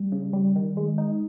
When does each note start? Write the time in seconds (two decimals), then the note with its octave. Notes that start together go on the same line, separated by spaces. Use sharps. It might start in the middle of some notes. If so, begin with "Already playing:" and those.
Already playing: G3
0.12 C#3
0.33 G3
0.56 D#3
0.77 G#3
0.98 D#4